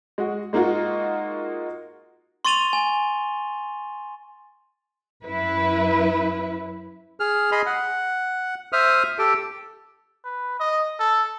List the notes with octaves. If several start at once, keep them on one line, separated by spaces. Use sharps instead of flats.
G#3 F#4
G#3 A#3 D#4 F4 F#4
C6 C#6 A6 D#7 F7 G7
G#5
F#2 E4 B4
G#4 F6
G#4 D#5 B5 C6
F#5
C5 E5 D#6 F6
G4 A4 G5
B4
D#5
A4